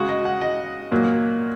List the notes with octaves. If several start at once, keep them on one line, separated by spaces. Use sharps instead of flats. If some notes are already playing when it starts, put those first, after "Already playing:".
Already playing: C#3 G#3 F#4
D#5
F#5
D#5
A#2 F#3 A#3